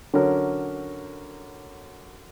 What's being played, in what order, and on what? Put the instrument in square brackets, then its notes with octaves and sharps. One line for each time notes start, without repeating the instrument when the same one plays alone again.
[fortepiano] D3 F#3 C#4 F#4 A#4